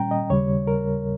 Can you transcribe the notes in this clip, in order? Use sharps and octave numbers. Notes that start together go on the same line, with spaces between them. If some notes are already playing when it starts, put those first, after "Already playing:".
Already playing: A#2 G3 C#4 G5 A#5
D#5
D#2 C#3 G3 C#5
A#4